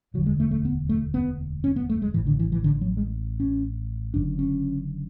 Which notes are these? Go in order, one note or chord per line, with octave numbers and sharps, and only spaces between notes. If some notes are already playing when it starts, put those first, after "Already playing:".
E1 D2 D3 F#3
G#3
A3
A3
B3
A3
B3
C#4
B3
A3
G#3
A1 A2 E3
D3
E3
E3
D3
F#3
G#3
C#4
F#1 F#2 D3 D4
C#4